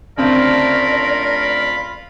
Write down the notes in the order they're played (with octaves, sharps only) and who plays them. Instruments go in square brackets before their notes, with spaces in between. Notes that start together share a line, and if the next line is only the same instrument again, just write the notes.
[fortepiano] D2 C#3 C4 [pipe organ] F4 B5 [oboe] A#4 [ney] D5